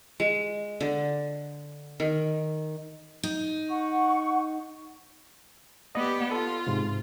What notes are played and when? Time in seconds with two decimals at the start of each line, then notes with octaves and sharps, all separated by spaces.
0.20 G#3
0.81 D3
2.00 D#3
3.23 D#4
3.70 F#5 C#6
5.95 B3 G4 D5 D#5
6.31 F4 A4
6.67 G#2 C3